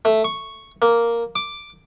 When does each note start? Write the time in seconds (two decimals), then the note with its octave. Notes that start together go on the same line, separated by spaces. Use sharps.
0.05 A3
0.24 C#6
0.82 A#3
1.36 D6